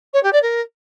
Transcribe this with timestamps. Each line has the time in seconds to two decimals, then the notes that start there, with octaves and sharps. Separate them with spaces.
0.13 C#5
0.23 G4
0.33 D5
0.42 A#4